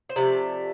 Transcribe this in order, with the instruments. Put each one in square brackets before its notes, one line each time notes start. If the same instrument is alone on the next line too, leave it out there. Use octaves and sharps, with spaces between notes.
[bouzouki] C5
C3 F3 A3 D5